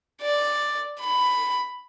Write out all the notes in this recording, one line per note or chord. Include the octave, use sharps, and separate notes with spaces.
D5
B5